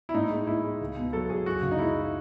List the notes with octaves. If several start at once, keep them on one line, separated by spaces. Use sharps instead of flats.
E4
A2 D#4
G#3
A2 E4
G#3
C#2
B2
F#3 A4
C#2 G#4
F#2 F#4
C#3
D#4
G#3 E4